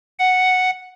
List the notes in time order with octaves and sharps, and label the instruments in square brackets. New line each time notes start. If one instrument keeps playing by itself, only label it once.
[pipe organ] F#5